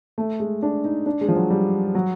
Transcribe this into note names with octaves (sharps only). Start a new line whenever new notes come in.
A3
G#3
D4
D#4
D4
G#3
F3
F#3
G3
F#3